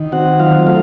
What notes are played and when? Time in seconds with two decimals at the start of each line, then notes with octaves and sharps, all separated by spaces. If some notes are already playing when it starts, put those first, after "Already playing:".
Already playing: D#3
0.12 C4 F#4 F#5
0.40 F#3 F4 F5
0.66 A3 F4 F5